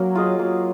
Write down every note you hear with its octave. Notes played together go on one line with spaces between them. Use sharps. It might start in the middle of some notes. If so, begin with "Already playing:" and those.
Already playing: F#3 A#3 C#4 A#4
F4 G#4 D#5
F#3 A#3